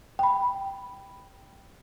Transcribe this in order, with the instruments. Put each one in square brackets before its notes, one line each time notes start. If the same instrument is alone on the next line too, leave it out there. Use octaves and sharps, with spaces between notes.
[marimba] G5 B5